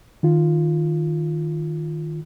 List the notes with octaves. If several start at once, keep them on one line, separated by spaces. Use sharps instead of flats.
D#3 F4